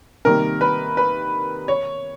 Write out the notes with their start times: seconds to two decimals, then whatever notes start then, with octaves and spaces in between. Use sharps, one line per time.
0.25 C3 D#3 G3 A#3 A#4
0.61 B4
0.97 B4
1.68 C#5